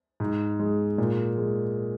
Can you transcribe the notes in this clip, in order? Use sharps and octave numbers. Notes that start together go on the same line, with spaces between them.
G#2
G#3
A#2
G#3